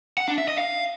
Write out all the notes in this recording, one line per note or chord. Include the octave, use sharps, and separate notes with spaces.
F#5
D4
E5
D#5
F5